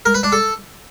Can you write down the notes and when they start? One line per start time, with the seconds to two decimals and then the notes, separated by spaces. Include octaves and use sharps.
0.05 A#4
0.14 B4
0.23 D4
0.32 A4